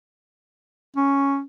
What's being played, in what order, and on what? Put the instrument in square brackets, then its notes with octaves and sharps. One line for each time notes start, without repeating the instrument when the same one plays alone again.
[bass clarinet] C#4